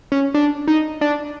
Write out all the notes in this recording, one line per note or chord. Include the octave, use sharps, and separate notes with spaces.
C#4
D4
D#4
D4